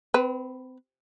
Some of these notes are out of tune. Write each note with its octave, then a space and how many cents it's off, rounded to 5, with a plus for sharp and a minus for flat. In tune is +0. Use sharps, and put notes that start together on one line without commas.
C4 -30 B4 +0